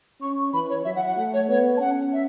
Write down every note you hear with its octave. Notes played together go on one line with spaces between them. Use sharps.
C#4 C#6
E3 B5
C#5
F#3 E5
F#5
F#5
A3 F#5
C#5
B3 C#5
A5
C#4 F#5
E5